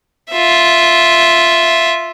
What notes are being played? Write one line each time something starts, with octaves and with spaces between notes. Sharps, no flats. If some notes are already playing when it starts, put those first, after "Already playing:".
F4 E5